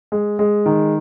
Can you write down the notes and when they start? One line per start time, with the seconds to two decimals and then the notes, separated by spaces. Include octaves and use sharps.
0.12 G#3
0.39 G#3
0.66 D#3